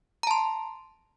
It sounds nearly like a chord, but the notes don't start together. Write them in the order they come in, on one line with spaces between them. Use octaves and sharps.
A#5 A5 C6